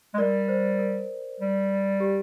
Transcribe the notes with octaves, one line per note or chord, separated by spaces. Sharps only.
G#3
G3 A#4 D5
C5
A#4
G3
G4